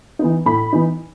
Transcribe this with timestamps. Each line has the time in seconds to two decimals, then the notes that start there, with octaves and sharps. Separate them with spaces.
0.19 E3 B3 D#4
0.46 A2 B5
0.73 E3 B3 D#4